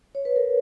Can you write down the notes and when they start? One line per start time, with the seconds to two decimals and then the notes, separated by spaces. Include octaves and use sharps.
0.15 C#5
0.25 B4
0.36 A#4